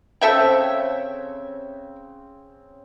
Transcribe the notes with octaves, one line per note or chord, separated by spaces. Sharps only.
C#3 C4 A4 E5 G5